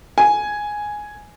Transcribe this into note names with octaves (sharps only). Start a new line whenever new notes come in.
G#5